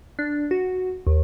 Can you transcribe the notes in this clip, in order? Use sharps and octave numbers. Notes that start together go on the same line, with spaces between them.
D4
F#4
D#2